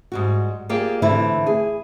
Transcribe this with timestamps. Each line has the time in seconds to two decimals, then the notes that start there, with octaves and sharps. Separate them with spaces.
0.12 G#2 G3 F#4
0.69 A#3 F4 G4 G#4 D5
1.02 A2 D3 E3 A3 C4 E4
1.47 G#4